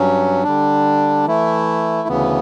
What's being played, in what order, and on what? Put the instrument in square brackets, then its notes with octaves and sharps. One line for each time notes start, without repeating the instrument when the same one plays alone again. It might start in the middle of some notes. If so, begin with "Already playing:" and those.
Already playing: [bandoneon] G2 F#3 C#4
D3 G3 D4
E3 A3 E4
D2 C#3 E3 B3